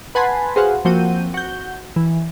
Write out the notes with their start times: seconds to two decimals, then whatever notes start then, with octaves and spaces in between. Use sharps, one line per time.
0.15 B4 F#5 G#5 A5 B5 C6
0.56 F#4 G#4 B4 C5 F5 F#5
0.85 F3 A#3 C4 F#4 G6 D#7
1.34 F#4 G6
1.96 E3